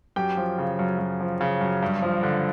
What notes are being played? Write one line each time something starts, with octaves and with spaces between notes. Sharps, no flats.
F#2 G4 G5
F3
C#3
F#2
F#2
F3
C#3
F#2
G2
F3
D3